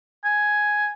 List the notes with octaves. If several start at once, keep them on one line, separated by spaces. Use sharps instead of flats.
G#5